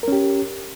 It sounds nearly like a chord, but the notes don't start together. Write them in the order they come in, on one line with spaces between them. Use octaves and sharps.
A#4 C#4 G4